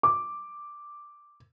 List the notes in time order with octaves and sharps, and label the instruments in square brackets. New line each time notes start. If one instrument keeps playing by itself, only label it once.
[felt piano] D6